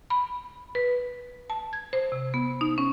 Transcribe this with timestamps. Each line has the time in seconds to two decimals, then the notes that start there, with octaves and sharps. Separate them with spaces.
0.10 B5
0.75 B4
1.50 A5
1.73 G#6
1.93 C5
2.12 C3
2.34 B3
2.61 D#4
2.78 C#4